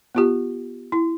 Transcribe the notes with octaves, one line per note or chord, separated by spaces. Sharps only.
B3 F4 G4
E4